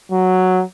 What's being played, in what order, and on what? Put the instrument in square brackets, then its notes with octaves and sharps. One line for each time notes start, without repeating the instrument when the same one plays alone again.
[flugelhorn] F#3